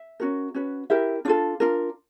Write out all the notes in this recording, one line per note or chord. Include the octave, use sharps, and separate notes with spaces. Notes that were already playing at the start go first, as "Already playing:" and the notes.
Already playing: E5
C#4 F#4 A#4
C#4 F#4 B4
E4 G4 A#4 E5
D4 F4 A4 F5
D4 F4 A#4